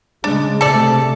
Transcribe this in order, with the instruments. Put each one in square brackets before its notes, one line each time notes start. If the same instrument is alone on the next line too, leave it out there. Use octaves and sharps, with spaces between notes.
[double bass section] C#3 G#3 [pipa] D4
[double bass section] C3 A3 [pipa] A4 D5